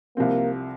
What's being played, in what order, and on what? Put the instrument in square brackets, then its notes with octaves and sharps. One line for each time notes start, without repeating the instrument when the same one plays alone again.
[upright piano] C2 C3 F3 C4 [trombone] A#3